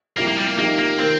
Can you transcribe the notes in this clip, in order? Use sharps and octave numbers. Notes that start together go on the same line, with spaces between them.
C2 C3 F3 A#3
A#3
G3
A#3
C3 F3 A#3 D#4 G4
A#3
D#3 A#3 C4